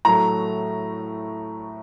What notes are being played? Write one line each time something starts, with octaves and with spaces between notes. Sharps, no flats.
A2 F#3 A3 A#5